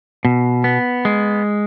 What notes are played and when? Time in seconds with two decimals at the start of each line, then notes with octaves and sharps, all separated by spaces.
0.25 B2
0.64 B3
1.05 G#3